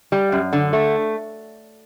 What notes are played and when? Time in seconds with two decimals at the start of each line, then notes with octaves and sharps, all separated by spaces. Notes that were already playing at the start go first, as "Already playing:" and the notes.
0.12 G3
0.32 F#2
0.53 D3
0.73 A3